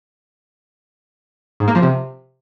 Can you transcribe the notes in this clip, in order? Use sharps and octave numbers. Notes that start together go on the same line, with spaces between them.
G#2
A#3
F3
C3